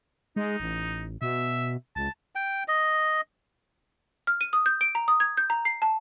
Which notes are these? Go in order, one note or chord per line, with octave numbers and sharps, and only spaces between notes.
G#3 D#4
A1
B2 E5
C#2 A5
G5
D#5
F6
D#7
D#6
G6
D7
A#5
D#6
G#6
G6
A#5
C7
A5